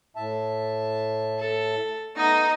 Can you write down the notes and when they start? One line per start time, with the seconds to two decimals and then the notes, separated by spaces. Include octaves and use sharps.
0.16 A2 E5 A5
1.40 A4
2.16 A3 B3 D#4 D#5